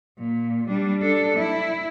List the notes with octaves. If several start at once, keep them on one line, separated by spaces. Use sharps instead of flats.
A#2
G3 D4
D4 A4
E4